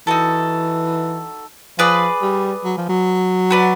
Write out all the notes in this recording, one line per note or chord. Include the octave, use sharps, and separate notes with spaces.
E3 D#4 F#4 A4
F3 G#4 B4 D5
G3
F#3
F3
F#3
F#4 B4 D5